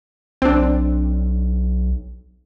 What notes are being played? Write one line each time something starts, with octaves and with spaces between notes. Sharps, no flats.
B1 C4 D4